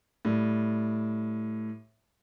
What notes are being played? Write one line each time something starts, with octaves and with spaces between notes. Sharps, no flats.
A2 G3